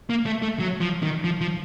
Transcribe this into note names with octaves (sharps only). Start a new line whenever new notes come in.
A#3
A3
A3
F#3
F3
D#3
F3
F3